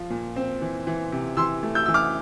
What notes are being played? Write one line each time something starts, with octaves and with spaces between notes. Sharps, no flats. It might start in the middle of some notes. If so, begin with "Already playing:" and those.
Already playing: F3
A#2
C4
E3
E3
C3
E3 C6 E6
A3
E6 G6
E3 E6
D6 F6